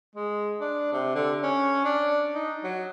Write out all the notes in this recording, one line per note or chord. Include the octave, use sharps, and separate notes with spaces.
G#3
D4
C3
D3
C#4
D4
D#4
F#3